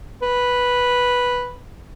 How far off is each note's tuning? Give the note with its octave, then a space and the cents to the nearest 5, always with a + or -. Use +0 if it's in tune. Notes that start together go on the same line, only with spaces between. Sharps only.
B4 -5